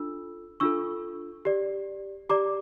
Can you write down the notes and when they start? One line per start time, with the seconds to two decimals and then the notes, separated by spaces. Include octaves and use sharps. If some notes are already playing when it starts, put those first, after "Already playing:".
Already playing: D4 F4 A4 E6
0.60 D4 F4 A4 C#6 E6
1.45 G4 D5
2.30 G4 D5 A#5 D6